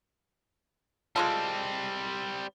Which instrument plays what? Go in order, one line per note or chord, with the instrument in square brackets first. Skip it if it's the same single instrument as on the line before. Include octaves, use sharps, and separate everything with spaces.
[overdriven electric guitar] G3 C4 [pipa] G#3 F4 A4